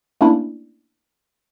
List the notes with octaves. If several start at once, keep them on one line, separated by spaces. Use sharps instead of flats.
A3 A#3 C#4 D4 E4